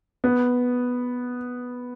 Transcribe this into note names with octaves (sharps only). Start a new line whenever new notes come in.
B3